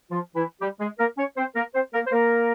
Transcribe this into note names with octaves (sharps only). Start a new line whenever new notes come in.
F3 F4
E3 E4
G3 G4
G#3 G#4
A#3 A#4
C#4 C#5
C4 C5
A#3 A#4
C4 C5
A#3 A#4
C5
A#3 A#4